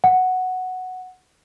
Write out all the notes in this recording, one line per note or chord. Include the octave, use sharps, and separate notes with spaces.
F#5